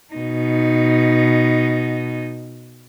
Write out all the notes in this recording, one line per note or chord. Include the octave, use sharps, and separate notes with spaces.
B2 D#4